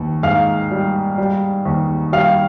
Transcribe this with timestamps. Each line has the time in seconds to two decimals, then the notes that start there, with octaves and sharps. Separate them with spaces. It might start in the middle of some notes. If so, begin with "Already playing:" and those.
Already playing: D#2
0.23 G#2 F5
0.71 G3
1.18 G3
1.65 D#2
2.12 G3 F5